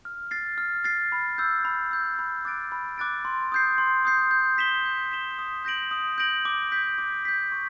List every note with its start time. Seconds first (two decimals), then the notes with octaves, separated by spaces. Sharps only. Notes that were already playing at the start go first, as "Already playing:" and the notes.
0.05 F6
0.31 A6 C7
0.58 F6
0.84 A6 C7
1.12 B5
1.38 E6 G6
1.65 B5
1.91 E6 G6
2.19 B5
2.45 D6 F#6 A6 D7
2.72 B5
2.98 D6 F#6 A6 D7
3.25 C6
3.52 D#6 G6 C7
3.78 C6
4.05 D#6 G6 C7
4.31 G6
4.58 B6 E7 G7
4.86 G6
5.12 B6 E7 G7
5.39 D#6
5.65 G6 A#6 D7 F#7
5.91 D#6
6.18 G6 A#6 D7 F#7
6.45 D6
6.72 G6 B6
6.98 D6
7.25 G6 B6
7.52 C#6